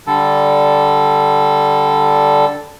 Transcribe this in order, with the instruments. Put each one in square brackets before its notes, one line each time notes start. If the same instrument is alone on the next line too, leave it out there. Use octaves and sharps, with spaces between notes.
[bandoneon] D3 G3 A4